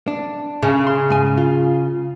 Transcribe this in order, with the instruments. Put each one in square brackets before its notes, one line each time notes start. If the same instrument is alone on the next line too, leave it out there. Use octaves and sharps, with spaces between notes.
[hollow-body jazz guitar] D4
[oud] C#3
[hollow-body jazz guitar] C6
G#2 G#5
F4